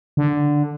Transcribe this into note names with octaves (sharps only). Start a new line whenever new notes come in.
D3